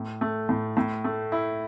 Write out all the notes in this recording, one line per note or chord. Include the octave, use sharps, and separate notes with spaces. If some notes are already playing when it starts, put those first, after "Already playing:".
Already playing: A2
A3
A2
A2
A3
E4